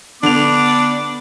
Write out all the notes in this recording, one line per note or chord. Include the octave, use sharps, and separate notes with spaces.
D3 B3 D4 D6 F7